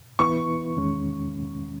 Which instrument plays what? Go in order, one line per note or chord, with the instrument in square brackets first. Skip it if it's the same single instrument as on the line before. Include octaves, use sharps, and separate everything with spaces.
[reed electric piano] E3 B3 E4 B4 [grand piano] C#6
[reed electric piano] E2 D#3 G#3 C#4